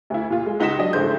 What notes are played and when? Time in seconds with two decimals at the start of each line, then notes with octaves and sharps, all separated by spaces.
0.10 D2 E4
0.30 A#2 F4
0.46 G#3
0.60 C#2 D#4 F#5 A#6 B6 E7
0.79 F#3 D4 D#5
0.93 A1 D3 G#3 C5 G6